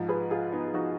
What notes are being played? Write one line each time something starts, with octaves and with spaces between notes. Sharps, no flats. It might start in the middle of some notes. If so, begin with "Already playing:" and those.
Already playing: G#2 F3
G#4 B4
F4 G#4
B3 D#4
F3 D#4 F#4